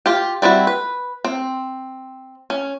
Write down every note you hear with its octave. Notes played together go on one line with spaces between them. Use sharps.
F4 G4
G3 C4 E4 F#4
B4
C4
C#4